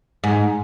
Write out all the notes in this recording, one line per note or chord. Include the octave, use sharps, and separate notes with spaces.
G#2